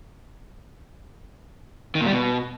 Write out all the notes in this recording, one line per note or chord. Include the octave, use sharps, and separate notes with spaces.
D#3
A#2
G3
B2